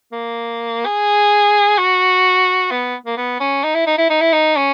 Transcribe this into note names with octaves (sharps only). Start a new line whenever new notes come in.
A#3
G#4
F#4
B3
A#3
B3
C#4
D#4
E4
D#4
E4
D#4
E4
D#4
C#4